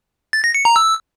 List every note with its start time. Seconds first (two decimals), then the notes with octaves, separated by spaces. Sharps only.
0.33 A6
0.44 A#6
0.55 C#7
0.65 A#5
0.76 E6